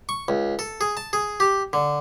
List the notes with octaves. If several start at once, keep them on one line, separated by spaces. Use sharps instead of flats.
C#6
C#2
A4
G#4
A5
G#4
G4
D3